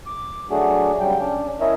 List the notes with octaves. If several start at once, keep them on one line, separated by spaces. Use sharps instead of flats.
D6
F#3 A3 D4 F#4 G#4
C#3 F#3 G3 G5
C#4 D4
C#4 E4 A#4 C#5 D#5 E5